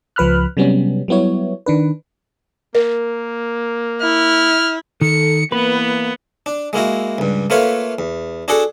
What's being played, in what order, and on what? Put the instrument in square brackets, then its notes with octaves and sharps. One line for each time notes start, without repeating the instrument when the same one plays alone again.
[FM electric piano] C#2 F3 B4 B5 F6 F#6
C3 F#3 G3 B3 C#4
F#3 G3 B3 E4 C#5
D#3 D4 B4
[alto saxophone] A#3 [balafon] A#4
[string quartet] E4 [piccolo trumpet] F6
[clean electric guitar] D#3 [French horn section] A4 [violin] C#7
[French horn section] E3 A#3 [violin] B3 [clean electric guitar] B4
[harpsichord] D4
G#3 A#3 E4 F#4
C#2 G2
A3 A#3 F4 B4 C#5
E2
D4 F#4 G#4 A4 F#5